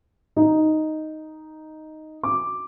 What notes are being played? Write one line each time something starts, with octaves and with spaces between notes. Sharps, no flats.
D#4
D6